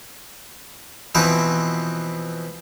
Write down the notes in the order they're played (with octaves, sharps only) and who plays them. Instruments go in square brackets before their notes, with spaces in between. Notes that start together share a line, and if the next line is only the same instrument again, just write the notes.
[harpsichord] B2 E3 F3 C4 B4